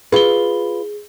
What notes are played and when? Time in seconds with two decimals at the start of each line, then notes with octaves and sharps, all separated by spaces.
0.12 F4 G#4 B4 G7